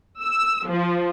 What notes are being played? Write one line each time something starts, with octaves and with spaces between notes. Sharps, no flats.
E6
F3